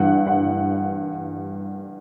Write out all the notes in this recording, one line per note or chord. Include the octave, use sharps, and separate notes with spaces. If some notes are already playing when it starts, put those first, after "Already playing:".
Already playing: G2 E3 G3 F#5
F#5